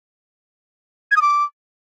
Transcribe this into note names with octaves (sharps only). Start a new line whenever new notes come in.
G#6
D#6
D6